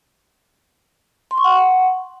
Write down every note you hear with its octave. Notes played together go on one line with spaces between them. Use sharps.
C6
C#6
F#5